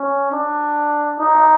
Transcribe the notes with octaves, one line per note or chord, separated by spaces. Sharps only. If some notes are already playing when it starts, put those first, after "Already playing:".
Already playing: C#4
D4
D#4